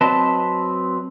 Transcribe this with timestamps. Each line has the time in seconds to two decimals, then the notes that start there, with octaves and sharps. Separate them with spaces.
0.01 F#3 C4 B4 D#5 A5